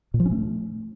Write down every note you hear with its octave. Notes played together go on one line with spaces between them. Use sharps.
A#2
F3
C#4
A3